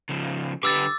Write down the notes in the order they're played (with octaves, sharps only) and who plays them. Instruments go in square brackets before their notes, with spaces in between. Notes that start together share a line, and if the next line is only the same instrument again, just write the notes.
[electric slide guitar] C#3 F3
[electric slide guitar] D3 G4 B4 [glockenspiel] D6 E6 A6